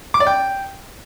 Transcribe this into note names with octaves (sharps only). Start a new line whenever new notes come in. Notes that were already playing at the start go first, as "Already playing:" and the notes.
D6
D5
G5